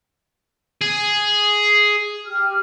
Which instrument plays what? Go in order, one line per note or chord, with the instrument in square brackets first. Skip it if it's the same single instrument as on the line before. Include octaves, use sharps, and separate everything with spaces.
[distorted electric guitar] G#4
[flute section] G4 F6